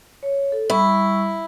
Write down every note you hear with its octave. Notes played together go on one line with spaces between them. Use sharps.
C#5
A4
G3 E4 C#6 E6